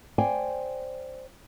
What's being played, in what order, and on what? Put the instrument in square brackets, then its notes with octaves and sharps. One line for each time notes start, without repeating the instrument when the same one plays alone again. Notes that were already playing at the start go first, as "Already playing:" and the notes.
[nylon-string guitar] C5 D5 G5 G#5